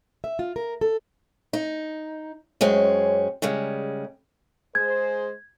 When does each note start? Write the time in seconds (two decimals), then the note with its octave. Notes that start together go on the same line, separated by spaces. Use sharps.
0.24 E5
0.39 F4
0.56 A#4
0.81 A4
1.53 D#4
2.61 F#2 G#3 C4 C#4
3.42 C#3 G3 G#3
4.75 G#3 G#4 C5 G#6